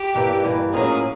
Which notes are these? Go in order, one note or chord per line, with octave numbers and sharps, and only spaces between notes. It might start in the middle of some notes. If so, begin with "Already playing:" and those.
Already playing: G4
G2 E3 G3 A#3
G2 E3 G3 A#3
A2 F#3 A#3 C#4 F4 G#4